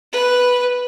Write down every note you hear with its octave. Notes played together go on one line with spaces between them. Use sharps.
B4